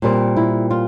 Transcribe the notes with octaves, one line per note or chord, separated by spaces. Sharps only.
A#2 G3 C4
E4
F4